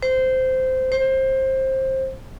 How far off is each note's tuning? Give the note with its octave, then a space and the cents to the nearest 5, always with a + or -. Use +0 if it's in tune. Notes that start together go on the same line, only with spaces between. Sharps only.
C5 -10
C5 +20